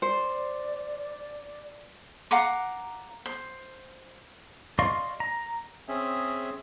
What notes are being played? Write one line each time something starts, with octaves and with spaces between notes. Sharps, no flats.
C5 D5
F5 F#5 A#5 D6
C5
D5 D#5 F5 C6 C#6
A#5
C4 C#4 G#4 E5